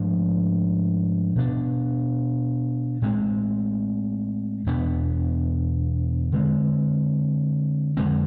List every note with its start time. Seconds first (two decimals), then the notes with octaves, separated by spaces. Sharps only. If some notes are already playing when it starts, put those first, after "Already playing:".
Already playing: G#2 F3 A3 D4
1.36 B2 B3 D4
3.02 A2 G#3 C4
4.66 E2 B2 B3 D4
6.32 D3 G#3 C4
7.97 F2 D3 G#3 C4